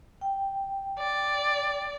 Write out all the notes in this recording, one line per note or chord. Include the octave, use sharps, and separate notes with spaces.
G5
D5